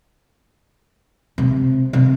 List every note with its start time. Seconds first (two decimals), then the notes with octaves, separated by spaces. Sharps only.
1.38 C3
1.93 C3